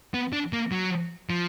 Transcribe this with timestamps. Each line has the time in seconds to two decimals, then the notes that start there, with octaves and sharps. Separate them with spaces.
0.14 B3
0.33 D4
0.53 A#3
0.72 F#3
1.30 F3